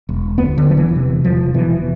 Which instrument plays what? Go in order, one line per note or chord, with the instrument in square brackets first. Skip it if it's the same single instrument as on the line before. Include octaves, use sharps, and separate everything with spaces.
[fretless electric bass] E1
D2 B3
D3
E1 F3
E3
C3
E1 F3
B2 E3